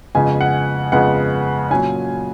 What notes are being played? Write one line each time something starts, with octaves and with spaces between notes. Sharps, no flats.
F2 C#3 G#3 B3 G#5
F#5
F2 C#3 G#3 B3 F#5
A#2 F#3 C#4 G#5